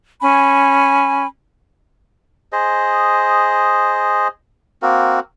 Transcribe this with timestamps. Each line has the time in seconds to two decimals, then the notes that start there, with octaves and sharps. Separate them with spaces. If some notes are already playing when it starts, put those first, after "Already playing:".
0.22 C#4 G#5 B5
2.52 G#4 C5 D#5
4.82 A#3 C4 F#4 A#4